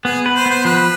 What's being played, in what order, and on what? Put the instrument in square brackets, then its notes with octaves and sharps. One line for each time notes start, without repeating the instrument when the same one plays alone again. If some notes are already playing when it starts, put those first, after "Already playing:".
[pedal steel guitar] B3 [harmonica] G#4
[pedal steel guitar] B4
[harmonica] C5
[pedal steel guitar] B3 [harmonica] C5
[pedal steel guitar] F3 [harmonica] B4